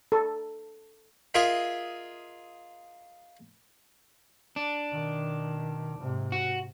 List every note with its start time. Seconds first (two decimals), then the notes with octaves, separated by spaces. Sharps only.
0.12 A4
1.34 F4 G#4 A#4 D#5 E5
4.56 D4
4.91 B2 D#3
5.98 G#2 C3
6.32 F#4